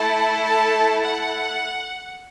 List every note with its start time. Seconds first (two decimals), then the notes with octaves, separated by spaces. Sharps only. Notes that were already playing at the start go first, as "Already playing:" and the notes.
Already playing: A3 E4 A4 A5
0.43 A5
1.03 F#5